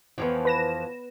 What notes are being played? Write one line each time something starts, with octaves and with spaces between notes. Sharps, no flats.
F2 E3 F3 B3 C#5 G5
B4 A#6 E7